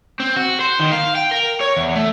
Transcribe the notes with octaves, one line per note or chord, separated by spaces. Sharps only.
C4
F#4
C5
D#3
F5
G5
A#4
C#5
E2
A3